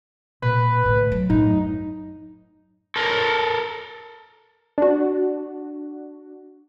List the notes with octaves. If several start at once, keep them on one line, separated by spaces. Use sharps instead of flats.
A#2 B4
A2 D3
F#3
F#2 A2 D#4
A4 A#4
D4 F#4